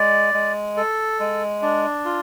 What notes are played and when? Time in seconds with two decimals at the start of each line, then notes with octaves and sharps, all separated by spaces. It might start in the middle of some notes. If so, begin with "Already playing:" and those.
Already playing: G#3 D5
0.34 G#3
0.77 A4
1.20 G#3
1.62 D4
2.05 F4